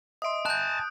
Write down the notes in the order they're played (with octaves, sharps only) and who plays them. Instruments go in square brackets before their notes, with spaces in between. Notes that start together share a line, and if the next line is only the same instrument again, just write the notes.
[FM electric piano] D#5 E5 C6 [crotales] D#6 D7
[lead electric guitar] G#5 A5 [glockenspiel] F#6 G6